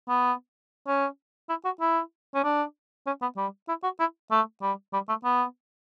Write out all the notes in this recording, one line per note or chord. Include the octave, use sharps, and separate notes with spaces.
B3
C#4
E4
F#4
E4
C#4
D4
C#4
B3
G3
E4
F#4
E4
A3
G3
G3
A3
B3